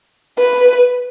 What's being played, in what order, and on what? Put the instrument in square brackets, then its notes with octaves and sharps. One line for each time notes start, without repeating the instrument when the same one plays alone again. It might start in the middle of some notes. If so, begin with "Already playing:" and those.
[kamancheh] B4